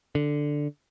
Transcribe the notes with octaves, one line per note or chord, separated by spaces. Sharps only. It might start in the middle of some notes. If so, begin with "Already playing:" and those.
D3